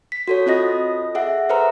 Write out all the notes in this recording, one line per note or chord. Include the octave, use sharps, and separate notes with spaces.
B6
F#4 A4 C#5
C4 F4 A4 D#5 A#6
G#4 E5 F#5
A4 B4 C5 E5 A#5